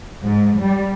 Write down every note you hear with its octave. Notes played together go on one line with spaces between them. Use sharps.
G#2
G3